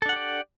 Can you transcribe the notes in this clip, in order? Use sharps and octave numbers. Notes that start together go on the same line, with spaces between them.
D4 G4 A4 D5 F#5